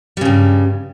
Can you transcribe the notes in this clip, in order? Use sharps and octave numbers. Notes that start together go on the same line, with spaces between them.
G2 C#3 G3